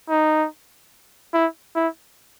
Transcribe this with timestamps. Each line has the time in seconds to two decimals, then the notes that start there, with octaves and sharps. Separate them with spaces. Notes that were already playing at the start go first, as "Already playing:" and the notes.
0.09 D#4
1.33 E4
1.75 E4